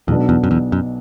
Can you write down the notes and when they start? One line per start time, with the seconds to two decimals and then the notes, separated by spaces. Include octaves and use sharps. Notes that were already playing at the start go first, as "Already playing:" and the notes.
0.07 B1 E2 B2 F#3 B3 D4
0.29 E2
0.44 F#2
0.51 E2
0.72 F#2